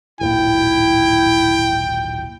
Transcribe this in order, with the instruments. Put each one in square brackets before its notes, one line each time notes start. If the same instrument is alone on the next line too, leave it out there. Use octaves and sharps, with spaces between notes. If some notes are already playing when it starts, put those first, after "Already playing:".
[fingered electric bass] D1 G#1 A#2 [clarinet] E4 [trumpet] G5